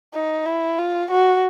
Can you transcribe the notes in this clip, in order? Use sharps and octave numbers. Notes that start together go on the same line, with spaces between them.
D#4
E4
F4
F#4